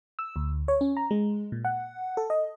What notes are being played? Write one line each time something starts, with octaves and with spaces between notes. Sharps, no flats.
E6
D2
C#5
C#4
A#5
G#3
A#2
F#5
A4
D#5